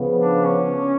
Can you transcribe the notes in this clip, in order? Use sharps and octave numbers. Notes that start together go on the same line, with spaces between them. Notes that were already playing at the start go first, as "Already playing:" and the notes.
Already playing: C#3 F3 B3
D4
C#4